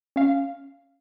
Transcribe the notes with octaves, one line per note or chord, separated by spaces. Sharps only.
C#4 F5